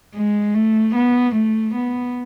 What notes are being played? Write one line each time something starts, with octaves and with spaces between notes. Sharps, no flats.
G#3
A3
B3
A3
B3